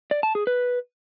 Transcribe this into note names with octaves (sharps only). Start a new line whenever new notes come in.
D5
A5
G#4
B4